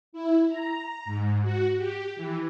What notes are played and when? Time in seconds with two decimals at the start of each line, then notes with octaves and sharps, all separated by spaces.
0.13 E4
0.49 A#5
1.05 G#2
1.42 F#4
1.77 G4
2.16 E3